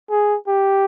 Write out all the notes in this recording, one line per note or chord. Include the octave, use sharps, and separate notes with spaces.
G#4
G4